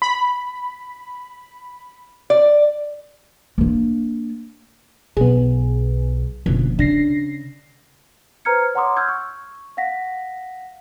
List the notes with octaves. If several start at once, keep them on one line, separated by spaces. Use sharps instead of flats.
B5
D5
A#3 D4
B1 B3 G#4
F#1 B2 D3 F3
C#3 D4 A#6 C7
B4 C5 A#5 F6 G#6 C#7
C#5 F#5 A#5 C6 D6 D#6
E6 F6 G6 G#6
C#6
F5 F#5 A#6 B6